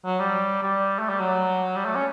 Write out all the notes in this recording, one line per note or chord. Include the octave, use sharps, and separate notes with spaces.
F#3
G3
G3
A3
G3
F#3
G3
A3
C#4